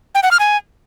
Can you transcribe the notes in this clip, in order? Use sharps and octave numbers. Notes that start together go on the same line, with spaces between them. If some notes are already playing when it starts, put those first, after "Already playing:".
G5
F#5
F6
G#5